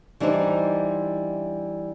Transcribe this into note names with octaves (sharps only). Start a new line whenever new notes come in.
E3 G3 D4 D#4 C5